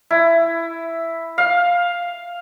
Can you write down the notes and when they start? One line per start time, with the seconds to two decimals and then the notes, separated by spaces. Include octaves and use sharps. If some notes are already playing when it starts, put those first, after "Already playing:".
0.10 E4
1.38 F5